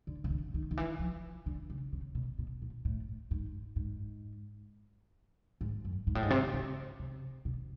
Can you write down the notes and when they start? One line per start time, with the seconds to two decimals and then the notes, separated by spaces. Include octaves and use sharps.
0.07 D3
0.24 C#3
0.30 D3
0.54 D#3
0.71 D#3
0.77 E3
0.99 F3
1.46 D3
1.70 C#3
1.93 C#3
2.15 B2
2.39 B2
2.62 A#2
2.85 A2
3.31 G#2
3.76 G#2
5.61 G#2
5.85 F#2
6.07 G#2
6.15 A2
6.23 G#2
6.30 C3
6.54 C#3
6.99 C3
7.45 B2